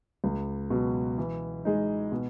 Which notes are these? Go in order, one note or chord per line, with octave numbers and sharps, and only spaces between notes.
C#2
B2 F#3
E3
G#3 D#4
B2